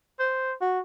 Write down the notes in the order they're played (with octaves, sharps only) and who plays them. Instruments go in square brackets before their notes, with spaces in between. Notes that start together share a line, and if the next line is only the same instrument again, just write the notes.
[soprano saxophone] C5
F#4